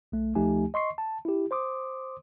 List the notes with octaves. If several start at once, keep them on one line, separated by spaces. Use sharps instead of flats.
B1 A3
D2 F3 A3 D#4 G4 G#5
D#5 C6 C#6 C7
A5
E4 G4
C5 C6 D6 D#6